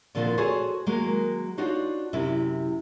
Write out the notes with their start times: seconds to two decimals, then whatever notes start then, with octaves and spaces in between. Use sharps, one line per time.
0.15 A#2 D3 D#3 F3 A#3 C4
0.38 F#4 G#4 A4 C5 C#5 G#5
0.86 D#3 F#3 G#3 A#3
1.58 D4 D#4 F4 F#4 C5 C#5
2.13 F#2 C3 E4